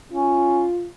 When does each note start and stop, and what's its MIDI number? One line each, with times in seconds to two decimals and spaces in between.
0.12 0.65 61
0.12 0.87 65